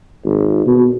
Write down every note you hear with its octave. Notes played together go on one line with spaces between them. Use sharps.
G#1
B2